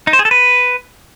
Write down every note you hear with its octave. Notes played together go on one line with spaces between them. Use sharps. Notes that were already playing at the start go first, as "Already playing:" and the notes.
D#4
C5
G#4
A4
B4